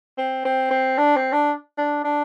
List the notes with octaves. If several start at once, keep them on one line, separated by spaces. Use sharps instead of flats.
C4
C4
C4
D4
C4
D4
D4
D4